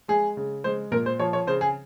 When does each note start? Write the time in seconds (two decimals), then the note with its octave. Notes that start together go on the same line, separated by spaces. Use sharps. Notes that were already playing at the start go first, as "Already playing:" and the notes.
0.08 G#3 G#4
0.37 C#3
0.64 G#3 C5
0.92 A#2 A#4
1.06 C5
1.19 F3 C#5
1.33 C#5
1.47 C#3 C5
1.61 G#4